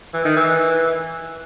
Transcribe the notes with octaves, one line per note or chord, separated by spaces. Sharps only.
E3
D#3
E3